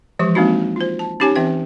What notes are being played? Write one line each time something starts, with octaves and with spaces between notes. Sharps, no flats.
E3 F3 G#3 G4 D6
G#3 A#3 C4 D4 D#4 F#4
F4 C5
A5
C#4 D#4 G4 C#5 G#5
E3 C4 E5 G5